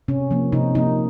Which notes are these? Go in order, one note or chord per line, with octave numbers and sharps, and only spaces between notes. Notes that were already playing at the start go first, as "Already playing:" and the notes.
C3 C#4
F3 A#3
C3 D#4
F3 A#3 D#4